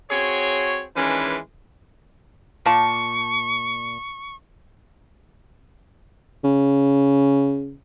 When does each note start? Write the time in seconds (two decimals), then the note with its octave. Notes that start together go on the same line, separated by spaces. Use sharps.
0.11 C4 F#4 G#4 C#5
0.96 D#3 E3 G#3 C#4 D4 B4
2.66 A#2 A5 C#6
6.44 C#3